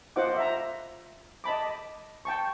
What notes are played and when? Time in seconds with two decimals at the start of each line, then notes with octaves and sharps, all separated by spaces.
0.16 F4 C5 D#5 F#5 D6
0.37 E5 A#5
1.44 D#5 A5 B5 D6
2.25 G5 A5 C#6